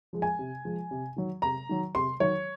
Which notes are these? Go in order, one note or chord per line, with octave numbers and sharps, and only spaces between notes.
F3 G#3
G#5
C3
F3 G#3
C3
D#3 F#3
C3 A#5
D#3 F#3
C3 C6
D#3 F#3 C#5